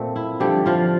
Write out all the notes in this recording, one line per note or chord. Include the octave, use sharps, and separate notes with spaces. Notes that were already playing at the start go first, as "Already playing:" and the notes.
Already playing: A#2 A3 C4
E4
D3 F3 G3 A3 G4
F3 F4